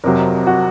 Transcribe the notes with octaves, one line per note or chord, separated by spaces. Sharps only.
F2 C3 F#3 A#4
F#4